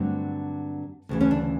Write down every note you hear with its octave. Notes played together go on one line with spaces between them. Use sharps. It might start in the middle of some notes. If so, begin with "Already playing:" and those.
Already playing: G2 D3 F#3 A3 C4
D2 C#3 E3
C#4
D4